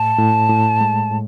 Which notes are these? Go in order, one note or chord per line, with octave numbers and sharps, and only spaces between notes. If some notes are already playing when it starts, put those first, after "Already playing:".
Already playing: A2 A5
A2
A2
G#3
A2